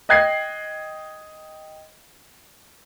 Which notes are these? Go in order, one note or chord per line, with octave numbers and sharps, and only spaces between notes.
D#5 G5 F#6 G#6 A#6 C7